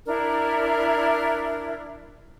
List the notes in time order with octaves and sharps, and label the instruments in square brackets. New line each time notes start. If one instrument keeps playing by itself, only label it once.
[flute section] D4 E4 A#4